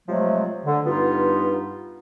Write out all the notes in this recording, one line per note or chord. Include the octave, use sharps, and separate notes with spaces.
C3 F3 F#3 G#3 A3
D3
G2 B3 D#4 F4